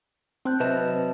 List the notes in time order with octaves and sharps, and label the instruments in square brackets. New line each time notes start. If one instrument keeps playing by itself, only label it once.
[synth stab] C4 [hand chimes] A5 F#6 G6
[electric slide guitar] C3 F#3 A5 [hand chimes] B4 D#5 E5